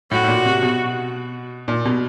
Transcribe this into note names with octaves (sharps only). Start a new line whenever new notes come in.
A2 F#4
A2
A#2
C3
B2
A#2
B2